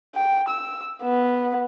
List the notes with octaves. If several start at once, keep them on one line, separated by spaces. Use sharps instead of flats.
G5
E6
B3